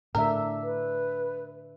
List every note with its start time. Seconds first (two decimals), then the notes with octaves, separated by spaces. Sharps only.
0.15 A2 D3 D4 A#4 E5
0.63 B4